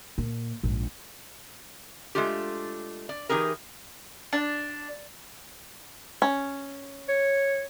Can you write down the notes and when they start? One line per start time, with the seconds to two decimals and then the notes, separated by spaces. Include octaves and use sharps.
0.18 A#2
0.63 A#1 G#2
2.15 G#3 A3 D4 F4 G4
3.09 D5
3.29 E3 D#4 G4 G#4 A#4
4.33 D4
6.22 C#4
7.09 C#5